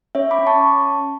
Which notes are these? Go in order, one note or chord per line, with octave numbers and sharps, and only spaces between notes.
C#4 C#5 E5
B5 D6
C#4
A5 C#6